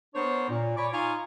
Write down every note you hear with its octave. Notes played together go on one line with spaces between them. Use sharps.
B3 D4 A#4 C5 C#5
A#2
C#5 D5 G#5 B5 C#6 D6
D#4 F4 F5 G#5 A#5 C#6